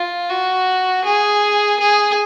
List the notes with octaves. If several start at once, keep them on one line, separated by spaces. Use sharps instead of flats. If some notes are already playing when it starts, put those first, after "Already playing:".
Already playing: F4
F#4
G#4
G#4